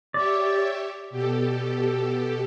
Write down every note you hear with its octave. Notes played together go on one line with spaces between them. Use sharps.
G4 C#5 D5 E5
B2 G4 A4